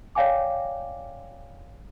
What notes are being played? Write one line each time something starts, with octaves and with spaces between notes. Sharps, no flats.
C#5 D5 F5 G5 G#5 D6